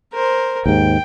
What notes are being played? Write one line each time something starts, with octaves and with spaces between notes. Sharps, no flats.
A#4 C5
D#2 G#2 G5